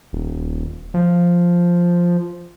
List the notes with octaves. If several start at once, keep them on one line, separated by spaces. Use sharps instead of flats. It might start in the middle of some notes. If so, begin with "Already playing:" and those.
D#1
F3